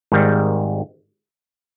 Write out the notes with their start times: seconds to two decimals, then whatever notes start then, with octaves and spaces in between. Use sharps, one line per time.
0.12 G#1 G#2 D#3 G3